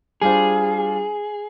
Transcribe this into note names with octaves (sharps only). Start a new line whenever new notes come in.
G3 D4 F4 G#4 C5